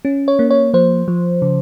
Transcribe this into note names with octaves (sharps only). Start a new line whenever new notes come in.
C#4
C#5
A#3
C#5
F3 C5
F3
C#3